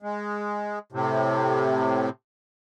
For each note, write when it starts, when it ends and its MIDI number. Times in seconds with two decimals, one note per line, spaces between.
0.02 0.79 56
0.92 2.09 45
0.92 2.09 48